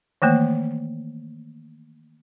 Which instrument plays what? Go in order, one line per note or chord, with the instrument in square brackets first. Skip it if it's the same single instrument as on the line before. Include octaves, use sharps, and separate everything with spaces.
[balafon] D#3 E3 A3 A#3